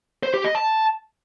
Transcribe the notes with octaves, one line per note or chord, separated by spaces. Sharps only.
C5
G4
D#5
A5